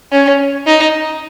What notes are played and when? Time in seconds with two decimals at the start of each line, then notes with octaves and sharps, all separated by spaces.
0.12 C#4
0.66 D#4